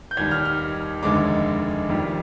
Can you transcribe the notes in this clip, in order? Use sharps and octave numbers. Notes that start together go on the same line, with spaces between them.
G6
D#2 D#3 G3 G#6
F6
F6
F1 D#2 D3 G#3 D6
F1 F2 D#3 G3